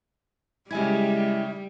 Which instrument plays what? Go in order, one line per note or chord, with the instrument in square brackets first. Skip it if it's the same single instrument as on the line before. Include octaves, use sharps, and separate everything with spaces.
[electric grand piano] C#3 G#5 G#6 [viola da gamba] G3 [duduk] G#3 [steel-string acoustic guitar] E4 G4